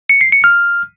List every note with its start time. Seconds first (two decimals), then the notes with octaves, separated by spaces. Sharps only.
0.09 C#7
0.21 C7
0.32 C#7
0.44 F6